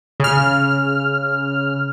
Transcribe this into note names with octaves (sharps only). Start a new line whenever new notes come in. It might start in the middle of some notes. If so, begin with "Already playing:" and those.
C#3 F6